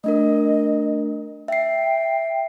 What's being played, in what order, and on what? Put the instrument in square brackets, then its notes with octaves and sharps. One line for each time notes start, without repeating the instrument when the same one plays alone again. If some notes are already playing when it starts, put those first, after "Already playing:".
[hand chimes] A3 D4 A#4 [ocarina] D#5
[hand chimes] E5 C7 [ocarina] G5